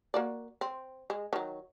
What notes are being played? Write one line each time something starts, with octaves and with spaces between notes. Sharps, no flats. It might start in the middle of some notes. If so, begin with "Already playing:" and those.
A#3 F#4 D5
C4
G#3
D#3 F#3